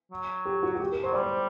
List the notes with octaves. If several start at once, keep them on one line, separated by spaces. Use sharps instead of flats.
F#3
G4
F#4
F#4
G4
A#4
F#3 C5
G3 D5
C5